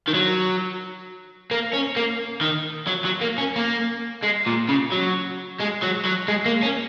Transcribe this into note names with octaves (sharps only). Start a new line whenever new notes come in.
D#3
F#3
A#3
C#4
A#3
D#3
F#3
F#3
A#3
C#4
A#3
G#3
A#2
C#3
F#3
G#3
F#3
F#3
G#3
A#3
C#4